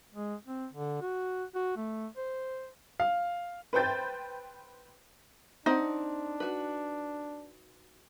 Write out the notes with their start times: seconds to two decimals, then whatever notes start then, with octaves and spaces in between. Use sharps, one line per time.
0.15 G#3
0.46 C4
0.73 D3
1.01 F#4
1.55 F#4
1.77 A3
2.17 C5
3.00 F5
3.73 B4 C5 G5 G6 A6
5.66 C4 D4 D#4 F#5
6.40 F#4 B4